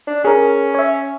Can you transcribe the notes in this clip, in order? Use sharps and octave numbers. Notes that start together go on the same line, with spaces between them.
D4
C#4 G#4 A#4
C#5 E5